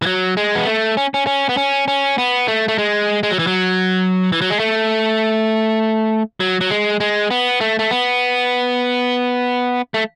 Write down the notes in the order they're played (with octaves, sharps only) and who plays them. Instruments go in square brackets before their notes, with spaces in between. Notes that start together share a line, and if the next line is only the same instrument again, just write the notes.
[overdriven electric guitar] E3
F#3
G#3
B3
A3
C#4
C#4
C#4
B3
C#4
C#4
B3
A3
A3
G#3
G#3
F#3
E3
F#3
E3
F#3
G#3
A3
F#3
F#3
G#3
G#3
B3
A3
A3
B3
A3